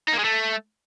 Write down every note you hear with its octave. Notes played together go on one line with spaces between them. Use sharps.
D#4
A#3
G#3
A3